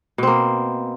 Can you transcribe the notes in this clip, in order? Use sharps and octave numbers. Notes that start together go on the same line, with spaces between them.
B2 A#3 C4